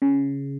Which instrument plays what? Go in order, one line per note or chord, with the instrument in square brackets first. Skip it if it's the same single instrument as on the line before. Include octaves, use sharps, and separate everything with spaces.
[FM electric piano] C#3